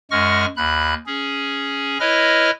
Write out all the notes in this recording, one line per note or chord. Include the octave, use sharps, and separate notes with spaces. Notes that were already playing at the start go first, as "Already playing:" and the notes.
F#2 G#3 F#5 C#6 F6 A#6
D#2 B5 F#6
C#4 G#4
E4 B4 C#5 D#5 F6 A#6